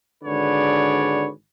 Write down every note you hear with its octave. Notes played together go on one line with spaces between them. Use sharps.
G#1 D3 G#4 B4 C#5 D5